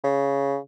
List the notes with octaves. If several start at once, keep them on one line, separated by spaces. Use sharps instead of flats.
C#3